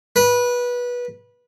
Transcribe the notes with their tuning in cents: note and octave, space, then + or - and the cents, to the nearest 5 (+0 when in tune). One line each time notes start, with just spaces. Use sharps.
B4 -20